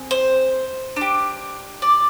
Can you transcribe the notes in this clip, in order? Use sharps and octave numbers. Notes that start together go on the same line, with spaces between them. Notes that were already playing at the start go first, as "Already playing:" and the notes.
Already playing: C4 G#4
C5
D4 G4
D5